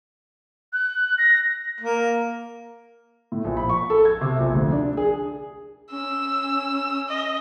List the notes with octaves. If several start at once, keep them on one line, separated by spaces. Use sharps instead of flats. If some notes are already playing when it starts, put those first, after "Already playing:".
F#6
A#6
A#3
A2
A#1
B5
C#6
A4
G#6
C3
A#1
D2
D4
G#4
C#4 E6
D#5